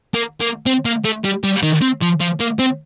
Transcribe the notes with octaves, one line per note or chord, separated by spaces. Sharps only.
A#3
A#3
C4
A#3
A3
G3
G3
D#3
C4
F3
F3
A#3
C4